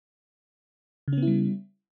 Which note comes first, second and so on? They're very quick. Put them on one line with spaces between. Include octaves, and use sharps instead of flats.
C#3 C#4 B3 E4 G3